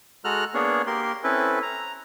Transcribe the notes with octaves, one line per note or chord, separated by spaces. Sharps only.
G#3 F#4 A4 A#5 F6 F#6
A#3 B3 D4 G#4 C#5
A#3 G4 A#4 C6
C4 C#4 E4 A4 B4
A#5